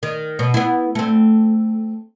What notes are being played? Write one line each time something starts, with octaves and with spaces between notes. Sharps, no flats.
D#3
B2
B3 E4
A3 C4